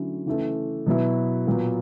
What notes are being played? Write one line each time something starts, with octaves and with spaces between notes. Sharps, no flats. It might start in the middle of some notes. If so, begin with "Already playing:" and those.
Already playing: D3 F#3 A3 C#4 E4
C#3 E3 A3
B2 F#3 B3 E4
A#2 F#3 B3